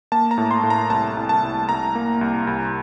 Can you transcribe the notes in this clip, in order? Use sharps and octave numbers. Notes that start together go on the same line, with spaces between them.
A#3 A5
A#5
A2
C6
A2
A#5
C2 A5
C2
A5
C2
C2 A#5
A#3
C2
C2